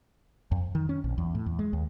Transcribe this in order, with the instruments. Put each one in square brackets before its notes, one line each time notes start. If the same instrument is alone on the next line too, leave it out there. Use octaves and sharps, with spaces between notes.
[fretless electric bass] F2
D#3
C#4
A#1
E2
A2
E2
G#3
D#2